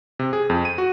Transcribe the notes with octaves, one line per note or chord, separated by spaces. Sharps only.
C3
G#4
F2
D#7
F#4